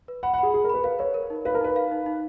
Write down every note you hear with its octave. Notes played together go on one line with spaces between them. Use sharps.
B4
F#5 B5
F#5
G#4 B5
G#4 B5
A#4
B4 B5
B4 F5
B4 C#5
A#4
D#4
B4 F5
A#4
D#4 B4
F5
D#4
D#4